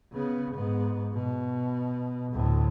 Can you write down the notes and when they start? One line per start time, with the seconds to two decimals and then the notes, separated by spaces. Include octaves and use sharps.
0.13 C#3 B3
0.55 G#2 B3
1.13 B2
2.33 D2 A2